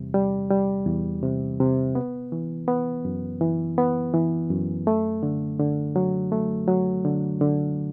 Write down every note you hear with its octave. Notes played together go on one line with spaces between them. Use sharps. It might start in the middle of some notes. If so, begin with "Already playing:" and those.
Already playing: E2 C3 G3
G3
G3
E2
C3
C3
B3
E3
B3
F#2
E3
B3
E3
F#2
A3
D3
D3
F#3
A3
F#3
D3
D3